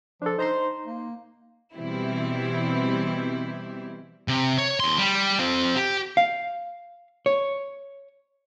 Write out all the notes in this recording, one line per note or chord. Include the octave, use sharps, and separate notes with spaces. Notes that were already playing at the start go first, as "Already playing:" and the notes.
F3 D4 A4
D#4 C5 A#5 C6
A#3
B2 E3 G3 C4 E4
C3
C#5
D#2 C6
G3
C4 F4
G4
F5
C#5